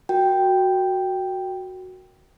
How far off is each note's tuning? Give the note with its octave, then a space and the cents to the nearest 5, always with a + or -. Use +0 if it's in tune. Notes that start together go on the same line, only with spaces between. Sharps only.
F#4 +0 A#4 +0 G5 +0